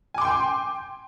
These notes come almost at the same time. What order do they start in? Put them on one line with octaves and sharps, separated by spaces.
G#5 D6 C6 G5